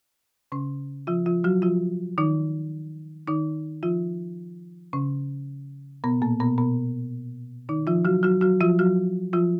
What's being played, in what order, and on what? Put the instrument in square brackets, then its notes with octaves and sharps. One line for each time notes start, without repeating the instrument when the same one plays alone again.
[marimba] C#3 C#4
F3 F4
F3 F4
F#3 F#4
F3 F4
D#3 D#4
D#3 D#4
F3 F4
C#3 C#4
B2 B3
A#2 A#3
B2 B3
B2 B3
D#3 D#4
F3 F4
F#3 F#4
F#3 F#4
F#3 F#4
F3 F4
F#3 F#4
F3 F4